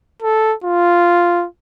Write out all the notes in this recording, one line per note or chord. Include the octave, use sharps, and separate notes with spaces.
A4
F4